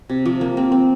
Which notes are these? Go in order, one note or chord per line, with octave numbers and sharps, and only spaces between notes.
C3
F3
A#3
C4
C4